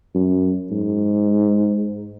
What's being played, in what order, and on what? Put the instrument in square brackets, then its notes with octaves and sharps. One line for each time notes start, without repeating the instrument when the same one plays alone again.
[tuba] F#2
G#2